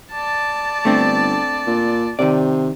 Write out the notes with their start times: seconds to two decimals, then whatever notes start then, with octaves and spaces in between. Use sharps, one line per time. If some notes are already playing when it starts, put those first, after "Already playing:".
0.12 D5 A5
0.85 G1 A3 C4 D4
1.67 A#2
2.19 C3 D#3 D5